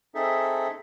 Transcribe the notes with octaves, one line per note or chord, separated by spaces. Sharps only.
C4 D#4 G#4 A4 E5